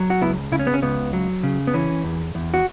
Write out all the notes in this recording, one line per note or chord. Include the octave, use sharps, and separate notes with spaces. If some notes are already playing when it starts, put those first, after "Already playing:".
Already playing: F#3
F#4
C#2 B3 E4
C#3 E4
C#4
B3
C#4
C#2 B3
F#3
C#3
B3
E3 C#4
E2
E2
F#4